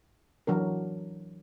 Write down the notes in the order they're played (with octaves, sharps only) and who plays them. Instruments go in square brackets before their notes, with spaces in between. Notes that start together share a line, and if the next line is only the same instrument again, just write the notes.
[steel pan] E3 F#3 D4 A#4